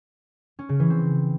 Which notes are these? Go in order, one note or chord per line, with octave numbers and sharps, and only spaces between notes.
C#4
C#3
E3
C4